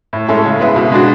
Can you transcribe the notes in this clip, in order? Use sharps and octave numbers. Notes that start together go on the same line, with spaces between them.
A2
G#3 C#4 E4 A4
C#3
G#3 B3 E4
B2
G#3 D4 F#4